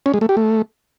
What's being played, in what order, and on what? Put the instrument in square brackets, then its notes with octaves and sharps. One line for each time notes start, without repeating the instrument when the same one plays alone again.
[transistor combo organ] C#4
G#3
A3
G4
A3